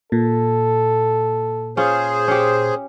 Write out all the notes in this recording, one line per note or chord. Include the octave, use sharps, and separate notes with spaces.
A#2 A4
C#4 F4 G#4 C5
C#4 G4